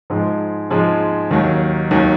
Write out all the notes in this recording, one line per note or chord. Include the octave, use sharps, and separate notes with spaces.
G#2 F3 G#3
G#2 F3 G#3
D#2 D#3 F#3
D#2 D#3 F#3